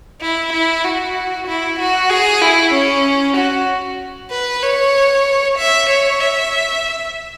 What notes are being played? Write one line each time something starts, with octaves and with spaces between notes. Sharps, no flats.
E4
E4
F#4
E4
F#4
G#4
E4
C#4
F#4
B4
C#5
E5
C#5
E5